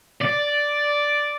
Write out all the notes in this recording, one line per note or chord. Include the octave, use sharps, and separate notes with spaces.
D5